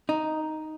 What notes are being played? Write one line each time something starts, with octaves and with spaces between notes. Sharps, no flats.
D#4